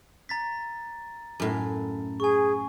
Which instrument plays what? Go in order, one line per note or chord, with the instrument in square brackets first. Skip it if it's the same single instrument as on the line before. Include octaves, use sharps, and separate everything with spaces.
[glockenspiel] A#5 A6 B6
[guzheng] F#2 A2
[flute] G#4 [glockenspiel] G#5 C#6